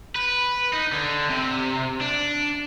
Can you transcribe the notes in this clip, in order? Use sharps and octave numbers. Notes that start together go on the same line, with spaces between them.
B4
D#4
D3
C3
D4